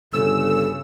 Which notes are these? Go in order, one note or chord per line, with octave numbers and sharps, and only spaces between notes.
G1 C#3 A4 E6